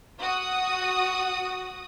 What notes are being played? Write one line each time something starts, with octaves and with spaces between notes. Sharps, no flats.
F#4 D#6